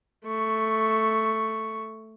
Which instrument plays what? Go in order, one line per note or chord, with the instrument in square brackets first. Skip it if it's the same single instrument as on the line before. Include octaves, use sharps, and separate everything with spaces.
[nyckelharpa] A3 C#6